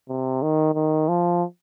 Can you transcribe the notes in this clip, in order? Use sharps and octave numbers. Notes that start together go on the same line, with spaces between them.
C3
D#3
D#3
F3